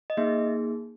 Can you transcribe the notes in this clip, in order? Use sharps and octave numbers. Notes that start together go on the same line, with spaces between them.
D#5
A#3 D#4 G#4 E5